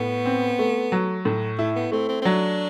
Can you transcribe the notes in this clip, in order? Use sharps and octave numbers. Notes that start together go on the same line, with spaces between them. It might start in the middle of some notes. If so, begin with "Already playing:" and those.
Already playing: A2 B3
C4
A3
F#3
A2
A3 E4
B3
A3 C4
C4
C4
F#3 D4